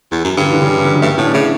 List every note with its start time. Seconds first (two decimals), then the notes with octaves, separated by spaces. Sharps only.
0.11 E2
0.24 F#2
0.37 G2 D3
0.45 E3
0.53 D3
0.62 C#3
0.70 D3
0.85 D3
0.94 F#3
1.02 G2 A3
1.10 B3
1.17 A2 C#4
1.26 D4
1.34 C#3 E4